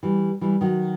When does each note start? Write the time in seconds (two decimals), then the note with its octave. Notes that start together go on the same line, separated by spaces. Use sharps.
0.03 E3 G3
0.41 E3 G3
0.61 D#3 F#3